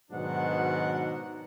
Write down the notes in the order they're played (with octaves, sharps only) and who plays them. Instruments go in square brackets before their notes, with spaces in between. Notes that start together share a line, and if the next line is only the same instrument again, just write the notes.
[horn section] G#2 B2 D#3 F#3 D4 F#5